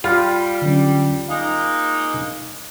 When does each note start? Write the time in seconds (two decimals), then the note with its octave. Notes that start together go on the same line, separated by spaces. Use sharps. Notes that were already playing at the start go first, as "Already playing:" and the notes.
0.04 G3 F4 B5 C6
0.62 D3 F#3 C#4
1.28 G#3 A#3 D#4 F5